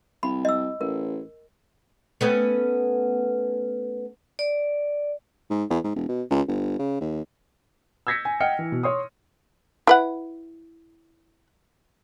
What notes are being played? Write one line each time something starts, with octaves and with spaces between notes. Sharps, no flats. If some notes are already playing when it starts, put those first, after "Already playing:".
C2 B5
D#5 E6
A1 A#4
A3 B3 C#4
D5
G#2
E2
G#2
E1
B2
C#2
G1
C#3
D#2
E6 G6 G#6 A#6 B6 C#7
G#5
D#5 F#5 G5 F6 C#7
E3
B2
C#5 C6 D#6
E4 B4 F#5